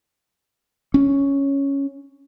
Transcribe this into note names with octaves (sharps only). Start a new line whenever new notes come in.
C#4